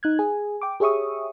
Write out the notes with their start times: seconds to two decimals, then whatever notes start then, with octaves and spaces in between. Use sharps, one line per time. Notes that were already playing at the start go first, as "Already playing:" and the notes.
0.03 D#4 F#6 G#6
0.19 G#4 G#5
0.61 G5 D6
0.80 G4 G#4 C#5 E5 C#6 D#6